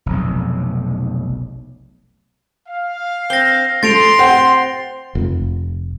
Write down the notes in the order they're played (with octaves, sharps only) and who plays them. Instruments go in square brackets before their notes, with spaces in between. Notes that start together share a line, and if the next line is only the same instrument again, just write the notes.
[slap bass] F1 B1
[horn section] F5
[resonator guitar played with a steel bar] C4 [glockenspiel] A#6 G7
[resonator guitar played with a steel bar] F3 [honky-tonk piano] A3 [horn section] C6 [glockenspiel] A6 D7 F7
[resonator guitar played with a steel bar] C4 [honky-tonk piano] F#5
[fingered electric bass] F1